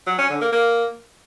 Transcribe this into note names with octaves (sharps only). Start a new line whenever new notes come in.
F#3
C#4
D3
A#3
A#3